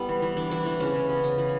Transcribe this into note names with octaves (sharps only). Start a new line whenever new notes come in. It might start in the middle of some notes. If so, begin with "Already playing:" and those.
Already playing: G3 B3 E4
E3
E3
E3 D4
E3 E4
E3 D4
C#3 C#4
C#3
B3
C#3
E3